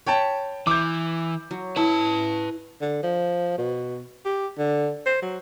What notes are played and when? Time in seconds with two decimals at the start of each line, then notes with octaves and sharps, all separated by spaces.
0.07 C#5 G5 A5 B5
0.67 E3 D6 G6
1.51 F#3
1.76 E4 B4 A5
2.81 D3
3.03 F3
3.58 B2
4.25 G4
4.58 D3
5.06 C5
5.22 F#3